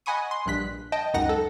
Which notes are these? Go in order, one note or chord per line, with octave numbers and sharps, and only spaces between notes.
D#5 F#5 G#5 B5 C#6 D#6
C6
A#1 G2 F#6 B6
D#5 G5 A5
C#2 F#2 D#4 F#5 A#6
A4